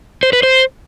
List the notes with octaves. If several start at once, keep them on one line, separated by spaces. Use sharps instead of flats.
C5
B4
C5